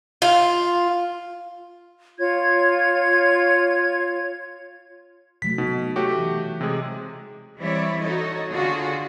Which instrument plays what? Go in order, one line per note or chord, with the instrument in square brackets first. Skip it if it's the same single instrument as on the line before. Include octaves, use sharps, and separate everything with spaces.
[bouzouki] F4
[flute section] F4 C#5 G#6
[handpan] C3 F#3 A3 [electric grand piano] B6
[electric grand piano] B2 [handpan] D#4
[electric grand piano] A3 F#4 G4 [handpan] C#5
[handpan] E3
[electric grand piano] C3 G#3 G#4
[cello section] E3 G3 C4 E4 C#5 D5
D#4 F#4 A4 C#5 D#5
D3 F4 F#4 G#4